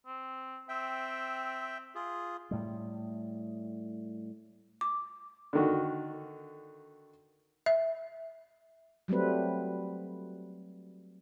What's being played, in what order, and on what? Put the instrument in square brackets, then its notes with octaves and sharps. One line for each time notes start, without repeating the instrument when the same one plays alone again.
[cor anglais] C4
[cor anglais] C4 [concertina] E5 G5
[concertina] F4 G#4
[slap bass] A2 G3
[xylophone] D6
[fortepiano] D3 D#3 F#4
[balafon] E5
[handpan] F#3 G3 A3 C4 B4